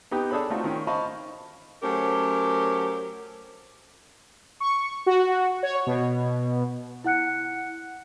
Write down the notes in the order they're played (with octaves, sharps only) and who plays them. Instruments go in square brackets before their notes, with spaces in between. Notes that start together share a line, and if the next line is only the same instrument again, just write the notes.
[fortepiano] B3 D#4 G4 G5
D4 G#4 A4 C#5 B5
A3 C4 D#4 F4 F#4
D#3 C#4 G5
C5 D#5 F5 A5 B5 C#6
[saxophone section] F#3 A3 C#4 G4 A#4 C5
[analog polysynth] C#6
F#4
C#5
B2
[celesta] E4 F#5 F#6 C#7